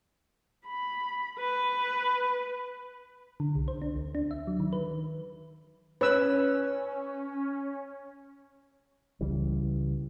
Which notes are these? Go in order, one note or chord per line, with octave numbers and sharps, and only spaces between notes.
B5
B4
D3
C2
C5
D4
D2
D4
E5
F#3
D#3
B4
C#4 B4 C#5 E6
C#2 C#3 E3 G3